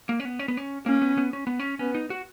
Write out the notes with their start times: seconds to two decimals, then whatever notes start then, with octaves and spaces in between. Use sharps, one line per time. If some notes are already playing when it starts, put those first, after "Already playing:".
0.09 A#3
0.20 C#4
0.25 B3
0.39 C#4
0.48 B3
0.57 C#4
0.86 A#3 C#4
1.02 B3
1.18 B3
1.33 C#4
1.47 B3
1.60 C#4
1.79 B3 C#4
1.95 D#4
2.10 F#4